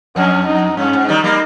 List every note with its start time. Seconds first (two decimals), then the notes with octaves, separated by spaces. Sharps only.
0.16 F2 C#4
0.47 D#4
0.77 G2 C#4
0.93 G#2
1.08 D#3 G3 D#4
1.24 G3 A#3